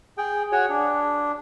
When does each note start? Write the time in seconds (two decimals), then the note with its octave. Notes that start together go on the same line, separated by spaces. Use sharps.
0.17 G#4 G5
0.52 F#4 G#4 C#5
0.69 D4